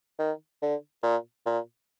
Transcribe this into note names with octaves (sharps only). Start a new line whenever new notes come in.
D#3
D3
A#2
A#2